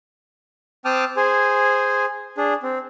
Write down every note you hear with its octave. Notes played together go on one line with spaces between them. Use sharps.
C4 G5 A5 D6 D#6 F6
G#4 C5 G#5
D4 G#4
C4